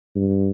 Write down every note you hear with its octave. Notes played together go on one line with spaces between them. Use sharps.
G2